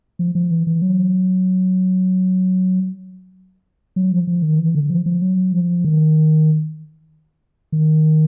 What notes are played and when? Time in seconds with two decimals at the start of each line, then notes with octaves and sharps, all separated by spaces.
0.19 F3
0.35 F3
0.51 E3
0.67 E3
0.82 F#3
3.96 F#3
4.12 F3
4.27 F3
4.42 D#3
4.59 E3
4.75 D3
4.90 F3
5.06 F3
5.22 F#3
5.52 F3
5.84 D#3
7.72 D#3